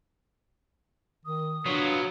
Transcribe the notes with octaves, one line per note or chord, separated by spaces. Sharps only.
D#3 D#6
F#3 B3 D4 F4